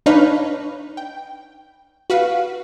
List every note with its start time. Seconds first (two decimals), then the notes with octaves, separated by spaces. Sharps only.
0.06 D4 D#4 B4 C#5 F5 B5
0.97 G5
2.10 F#4 B4 F5